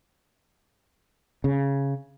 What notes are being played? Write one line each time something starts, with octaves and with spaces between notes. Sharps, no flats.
C#3